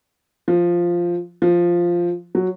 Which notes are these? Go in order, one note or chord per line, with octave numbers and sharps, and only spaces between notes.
F3
F3
F#3